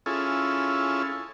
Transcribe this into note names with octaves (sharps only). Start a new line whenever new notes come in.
C#4 E4 F4 G#4 A4